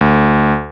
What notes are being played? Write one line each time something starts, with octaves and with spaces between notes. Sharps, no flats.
D2